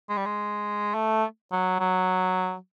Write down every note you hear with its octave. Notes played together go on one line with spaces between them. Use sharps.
G#3
G3
G#3
A3
F#3
F#3